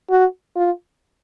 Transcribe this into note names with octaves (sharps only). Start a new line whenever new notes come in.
F#4
F4